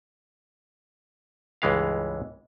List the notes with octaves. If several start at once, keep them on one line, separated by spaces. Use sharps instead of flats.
C#2 G2 E3 G#3 G4 F5